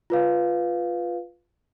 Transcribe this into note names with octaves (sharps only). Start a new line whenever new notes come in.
F4 B4 F5